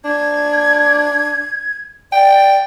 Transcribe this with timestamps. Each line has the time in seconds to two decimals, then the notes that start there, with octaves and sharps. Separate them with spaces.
0.05 D4 G#6
2.12 D5 G5